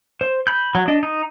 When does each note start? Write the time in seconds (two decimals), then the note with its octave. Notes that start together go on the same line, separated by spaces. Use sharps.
0.21 C5
0.47 B5 G6
0.75 F#3
0.88 D4 D#5
1.03 D#4